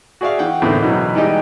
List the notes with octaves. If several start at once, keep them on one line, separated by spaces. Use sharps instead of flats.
F#4 G#4 D5 E5 F5
E3 F#5 G5
E2 A2 D3 D#3 A#3 C4
B2 E3 F#3
E3 G3 G#3 D#4 G4 D#5